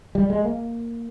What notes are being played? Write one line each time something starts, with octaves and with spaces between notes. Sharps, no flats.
G3
G#3
A#3